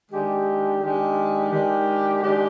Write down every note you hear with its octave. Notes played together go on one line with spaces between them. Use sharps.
D#3 G#3 D4 G4
D#3 G#3 D4 G4
D#3 G#3 D4 G4
D#3 G#3 D4 G4